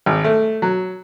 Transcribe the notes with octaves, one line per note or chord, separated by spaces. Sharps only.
G#1
A3
F#3